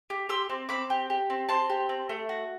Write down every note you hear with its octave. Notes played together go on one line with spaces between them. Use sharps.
G4
G4 C6 E6
C4
C4 B5 D6
G4
G4
C4
C4 A5 C6
G4
C4
A3
F#4